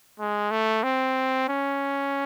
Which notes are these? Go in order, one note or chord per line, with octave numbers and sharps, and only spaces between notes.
G#3
A3
C4
C#4